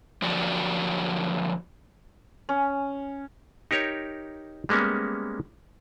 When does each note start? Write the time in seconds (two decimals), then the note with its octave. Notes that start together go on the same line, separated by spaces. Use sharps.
0.22 D3 F3 F#3 A#3 F#4 D5
2.49 C#4
3.71 D#4 G4 A#4 C#5
4.69 G3 G#3 A#3 B3 C#4